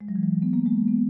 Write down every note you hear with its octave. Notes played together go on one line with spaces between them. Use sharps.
G#3
F#3
E3
F#3
B3
A#3
G#3
B3